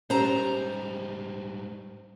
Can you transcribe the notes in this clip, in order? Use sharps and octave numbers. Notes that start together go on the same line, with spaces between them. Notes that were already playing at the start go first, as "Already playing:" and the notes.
G#2 G3 C#4 G4 C5 A#5